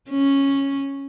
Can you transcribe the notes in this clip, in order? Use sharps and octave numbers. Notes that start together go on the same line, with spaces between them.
C#4